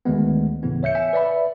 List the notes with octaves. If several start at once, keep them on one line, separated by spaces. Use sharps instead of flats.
D2 D#3 G#3 B3
D2 A2 C#3 E3 B3
C#5 E5 G6 C#7
E5 G#5
B4 D5 E5 B5